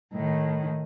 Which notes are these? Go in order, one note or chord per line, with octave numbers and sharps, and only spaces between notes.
A2 D#3